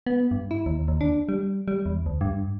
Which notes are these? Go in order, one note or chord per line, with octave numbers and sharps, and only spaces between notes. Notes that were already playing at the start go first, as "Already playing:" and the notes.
B3
G2
E4
D#2
D#2
D4
G3
G3
E2
D2
G2